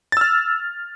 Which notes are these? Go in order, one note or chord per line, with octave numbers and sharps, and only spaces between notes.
E6 F6 A6